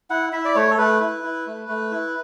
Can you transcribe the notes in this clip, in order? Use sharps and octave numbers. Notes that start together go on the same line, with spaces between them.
E4 F#5
E4 E5
D5
A3 C#5
A4
A3 B4
E4
E4
A3
A3
E4